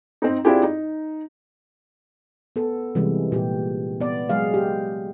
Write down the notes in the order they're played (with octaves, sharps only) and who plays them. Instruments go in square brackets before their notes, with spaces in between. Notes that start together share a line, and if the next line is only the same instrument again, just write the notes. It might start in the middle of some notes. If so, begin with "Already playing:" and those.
[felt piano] C4 D#4
C4 D4 E4 F4 G4 G#4
D#4
[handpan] B3 A4
C3 E3 G3 G#3
A#2 G4
B3 D5
F#3 G#3 G#4 F5
G4